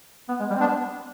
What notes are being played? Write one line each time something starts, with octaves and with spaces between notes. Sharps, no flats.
B3
G#3
G3
C4
B3 D4